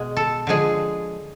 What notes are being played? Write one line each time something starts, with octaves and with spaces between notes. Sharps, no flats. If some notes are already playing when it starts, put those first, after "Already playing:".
Already playing: B2 G#3
A4
D3 F3 G#3 G#4